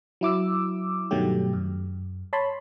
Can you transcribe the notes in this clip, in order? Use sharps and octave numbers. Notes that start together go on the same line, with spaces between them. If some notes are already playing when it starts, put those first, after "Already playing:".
F#3 E4 D6 E6
G2 B2 D#3 F#3 A3 G4
F#2
C#5 A5 B5 C6